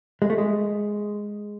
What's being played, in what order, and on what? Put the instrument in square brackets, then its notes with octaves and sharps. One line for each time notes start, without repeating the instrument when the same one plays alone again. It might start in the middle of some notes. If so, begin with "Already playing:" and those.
[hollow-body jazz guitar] G#3
A3
G#3